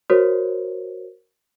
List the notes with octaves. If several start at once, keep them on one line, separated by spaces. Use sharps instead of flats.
F#4 A#4 C5 C#5